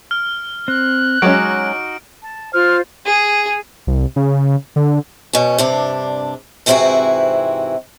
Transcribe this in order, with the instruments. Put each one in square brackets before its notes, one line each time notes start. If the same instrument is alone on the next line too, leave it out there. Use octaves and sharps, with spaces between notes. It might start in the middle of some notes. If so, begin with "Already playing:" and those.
[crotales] F6
[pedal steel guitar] C4 [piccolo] F#6
[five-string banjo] F#3 G#3 C#4 [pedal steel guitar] D#4 F#4 D6 [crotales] D7
[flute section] A5
[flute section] F4 C5 [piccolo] F6
[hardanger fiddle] G#4
[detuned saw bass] C2
C#3
D3
[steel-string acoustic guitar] B2 C#4
G2 C3 D4
G#2 C3 E3 C4 E4 F#4